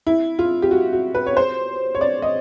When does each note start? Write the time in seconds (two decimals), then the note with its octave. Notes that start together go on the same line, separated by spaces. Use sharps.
0.07 E4
0.39 F4
0.62 G4
0.71 F#4
0.93 F#4
1.15 B4
1.26 C#5
1.37 C5
1.95 C#5
2.01 D5
2.22 D#5